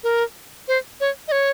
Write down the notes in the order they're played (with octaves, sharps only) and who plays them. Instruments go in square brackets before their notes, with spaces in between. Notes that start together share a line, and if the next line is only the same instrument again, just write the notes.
[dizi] A#4
C5
C#5
D#5
C#5